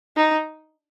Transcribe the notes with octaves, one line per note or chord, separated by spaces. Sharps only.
D#4